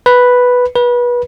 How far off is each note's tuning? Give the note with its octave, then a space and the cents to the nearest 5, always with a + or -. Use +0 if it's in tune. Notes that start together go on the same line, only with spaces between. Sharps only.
B4 +0
B4 -25